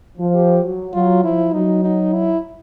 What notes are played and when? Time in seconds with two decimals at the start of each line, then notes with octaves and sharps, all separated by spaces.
0.18 F3
0.34 G4
0.63 F#3
0.93 F#3 F4
1.24 F3 E4
1.53 F#3 D#4
1.84 D#4
2.13 E4